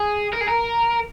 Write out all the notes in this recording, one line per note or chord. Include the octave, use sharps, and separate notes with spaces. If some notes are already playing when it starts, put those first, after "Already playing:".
Already playing: G#4
A#4
G#4
A#4